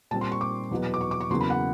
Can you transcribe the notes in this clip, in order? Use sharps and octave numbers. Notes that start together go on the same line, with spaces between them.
A#2 G3 C4 A5
C6
C#6
D6
E2 B2 F#3 B3
D6
C#6
D6
C#6
E2 C#3 F#3 A#3 C6
B5
F#5